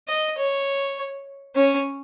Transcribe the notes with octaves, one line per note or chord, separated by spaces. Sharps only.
D#5
C#5
C#4